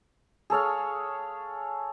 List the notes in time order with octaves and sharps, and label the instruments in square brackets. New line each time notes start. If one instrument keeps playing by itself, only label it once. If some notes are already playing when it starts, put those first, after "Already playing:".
[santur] G#4 A4 C#5 F5